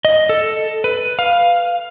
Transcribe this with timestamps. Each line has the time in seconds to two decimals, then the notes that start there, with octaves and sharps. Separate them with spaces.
0.05 D#5
0.29 A4
0.84 B4
1.19 F5